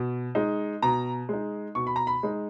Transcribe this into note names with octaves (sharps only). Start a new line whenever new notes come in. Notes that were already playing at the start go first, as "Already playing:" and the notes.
Already playing: B2
G#3 D#4
B2 A#5
G#3 D#4
B2 C#6
B5
A#5
B5
G#3 D#4